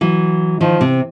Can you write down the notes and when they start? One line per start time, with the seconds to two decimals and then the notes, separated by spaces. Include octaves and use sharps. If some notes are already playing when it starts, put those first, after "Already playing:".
0.01 E3 F#3
0.61 D#3 F3
0.81 C3